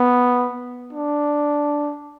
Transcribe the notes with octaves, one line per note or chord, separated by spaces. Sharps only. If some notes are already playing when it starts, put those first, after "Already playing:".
Already playing: B3
D4